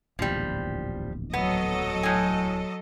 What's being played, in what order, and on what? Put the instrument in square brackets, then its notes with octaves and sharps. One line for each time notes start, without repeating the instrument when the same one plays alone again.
[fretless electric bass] D1 A#1 E2 [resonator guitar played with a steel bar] F3 G3
[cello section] F#3 A4 D#5 [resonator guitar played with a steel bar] B3
[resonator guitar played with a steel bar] A2 G#5